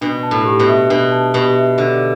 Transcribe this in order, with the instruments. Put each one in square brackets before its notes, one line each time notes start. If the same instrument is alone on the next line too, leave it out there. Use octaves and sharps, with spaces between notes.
[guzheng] B2 [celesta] D4
[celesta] A5
[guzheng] A2
[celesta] G4
[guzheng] B2
[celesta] E5
[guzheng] B2 [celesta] D4
[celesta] A5
[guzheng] B2 [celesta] G4
[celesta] E5
[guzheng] D3 [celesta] G4